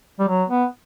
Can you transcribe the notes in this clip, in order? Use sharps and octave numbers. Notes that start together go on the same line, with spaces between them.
G3
F#3
B3